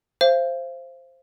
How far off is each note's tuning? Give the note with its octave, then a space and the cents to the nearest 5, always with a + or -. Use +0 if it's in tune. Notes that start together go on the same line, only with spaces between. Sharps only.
C5 +5 F5 -35